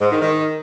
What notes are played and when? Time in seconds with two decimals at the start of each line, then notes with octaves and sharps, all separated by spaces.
0.01 G#2
0.11 D#3
0.21 D#3